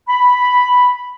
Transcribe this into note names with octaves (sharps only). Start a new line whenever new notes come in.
B5